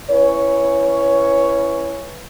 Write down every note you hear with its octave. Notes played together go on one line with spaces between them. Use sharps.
C#4 E4 B4 C#5